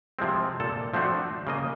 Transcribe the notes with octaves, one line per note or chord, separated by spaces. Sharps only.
C3 F3 G#3 C4
A#2 A4
F3 A3 C4 D4 F#4
C#3 A#3 D#5